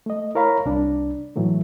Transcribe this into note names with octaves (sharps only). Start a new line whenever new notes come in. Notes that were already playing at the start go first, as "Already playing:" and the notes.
A3 D#5
E4 A#4 C#5 F5 A#5 B5
C2 D4
A2 E3 F#3 A3